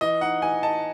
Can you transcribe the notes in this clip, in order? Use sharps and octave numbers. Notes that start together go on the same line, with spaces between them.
E3 D#5
D#4 F#5
E3 G#5
D#4 A5